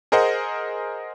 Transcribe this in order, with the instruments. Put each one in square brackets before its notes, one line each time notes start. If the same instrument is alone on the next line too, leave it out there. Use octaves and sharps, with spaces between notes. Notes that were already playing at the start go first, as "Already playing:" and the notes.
[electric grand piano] G#4 A#4 C5 D#5 F#5